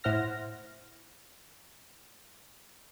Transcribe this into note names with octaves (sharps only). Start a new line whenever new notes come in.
A2 E4 C5 F#5 F6 A#6